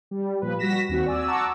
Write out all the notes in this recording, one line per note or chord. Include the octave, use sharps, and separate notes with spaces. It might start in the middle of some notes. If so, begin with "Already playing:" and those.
G3
A#2 F3 B4
G3 F#4 A#6 B6 E7
D#2 C4 F#4
D5 G#5 E6
F#5 A5 A#5 C#6 D6 E6